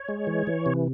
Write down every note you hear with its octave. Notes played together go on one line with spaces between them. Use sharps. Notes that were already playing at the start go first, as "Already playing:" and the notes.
Already playing: C#5
G#3
E3
E3
C3